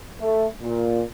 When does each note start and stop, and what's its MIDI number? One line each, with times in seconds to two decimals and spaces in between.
0.20 0.46 57
0.62 1.02 46